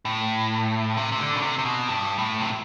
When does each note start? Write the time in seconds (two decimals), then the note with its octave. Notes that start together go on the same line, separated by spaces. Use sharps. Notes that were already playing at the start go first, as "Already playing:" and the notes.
0.05 A2
0.97 C3
1.12 C3
1.20 D3
1.37 B2
1.42 C3
1.59 C3
1.65 B2
1.89 G2
2.18 A2
2.41 C3